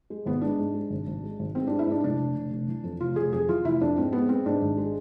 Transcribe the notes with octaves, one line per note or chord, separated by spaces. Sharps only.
G#3
G#1 B3
G#3 D4
G#2
G#3
G#1
G#1
G#3
G#1
G#2 C4
G#3 D4
E4
G#2 D4
F1 D4
F1
F1
F1
E3
F2
F1 F4
F1 G#4
F2 G#4
E3 F4
F1 E4
F2 D4
G#2 C4
G#3 B3
G#3 C4
G#2 D4
G#1
G#3